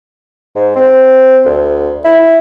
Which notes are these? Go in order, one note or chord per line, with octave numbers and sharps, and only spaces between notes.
G#2
C4
D2
E4